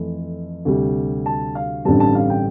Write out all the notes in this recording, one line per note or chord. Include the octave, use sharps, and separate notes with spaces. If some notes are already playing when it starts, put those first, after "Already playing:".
Already playing: F2 E3 A3
D2 C3 G3
A5
F5
A1 G2 D3 G3 C4 A5
A5
F5
G5